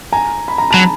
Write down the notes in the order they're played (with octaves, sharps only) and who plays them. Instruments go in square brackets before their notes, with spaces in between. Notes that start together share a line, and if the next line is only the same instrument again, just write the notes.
[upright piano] G#5 A#5
B5
A#5
[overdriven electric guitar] F#3 [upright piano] A5 B5